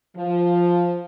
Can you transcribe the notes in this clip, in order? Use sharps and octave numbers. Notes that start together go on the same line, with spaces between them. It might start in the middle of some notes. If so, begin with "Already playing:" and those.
F3